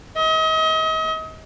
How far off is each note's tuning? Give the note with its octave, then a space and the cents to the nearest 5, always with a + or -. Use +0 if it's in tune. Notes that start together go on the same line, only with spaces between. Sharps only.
D#5 +35